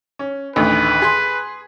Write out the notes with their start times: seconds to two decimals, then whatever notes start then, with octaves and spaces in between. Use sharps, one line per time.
0.19 C#4
0.56 A1 D2 D#3 B4
1.02 G#4 C6